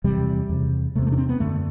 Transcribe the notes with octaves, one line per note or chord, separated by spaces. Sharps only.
E2 C3 G3
E2 C3
E2 C3 A3 B3
A3
D4
C4
B3
F#2 D3 A3